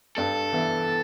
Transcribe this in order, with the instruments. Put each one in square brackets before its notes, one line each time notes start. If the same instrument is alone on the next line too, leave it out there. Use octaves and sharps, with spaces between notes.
[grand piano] G2 [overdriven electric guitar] A4
[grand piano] E3 B3 E4